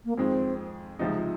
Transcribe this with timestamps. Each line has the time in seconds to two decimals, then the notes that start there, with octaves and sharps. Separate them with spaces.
0.05 A#3
0.17 F2 D#3 G#3 C4
0.99 C#2 C3 F3 G#3 D#4